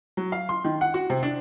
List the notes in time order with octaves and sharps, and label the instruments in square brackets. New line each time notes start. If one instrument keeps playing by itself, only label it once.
[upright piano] F#3
F5
C6
D#3
F#5
F#4
C3
D4